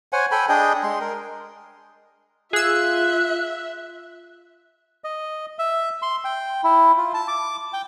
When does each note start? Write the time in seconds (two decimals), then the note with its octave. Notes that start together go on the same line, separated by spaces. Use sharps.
0.13 C5 C#5 F#5 G#5
0.31 A4 G5 G#5 B5
0.49 D4 G#4 D#5 G5
0.83 G#3 C6
1.01 A#4
2.53 F4 G#4 E5 E6 F#6
5.04 D#5
5.59 E5
6.02 C6
6.25 G5
6.64 E4
6.97 F4
7.14 A5
7.28 D6
7.73 G5